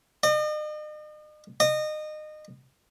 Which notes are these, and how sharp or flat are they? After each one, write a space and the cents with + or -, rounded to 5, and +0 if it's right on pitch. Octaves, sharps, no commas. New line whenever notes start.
D#5 -40
D#5 -25